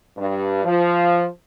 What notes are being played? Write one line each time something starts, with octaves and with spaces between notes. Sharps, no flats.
G2
F3